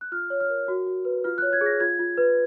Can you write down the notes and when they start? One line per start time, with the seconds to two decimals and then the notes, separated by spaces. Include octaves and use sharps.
0.01 F#6
0.12 F4 F6
0.30 C#5
0.40 F6
0.50 A#4
0.68 F#4
0.87 F#4
1.05 B4
1.24 F4 F6
1.38 F#6
1.42 C#5
1.53 G#6
1.61 G#4
1.66 A#6
1.80 F4 G#6
1.99 F4
2.18 B4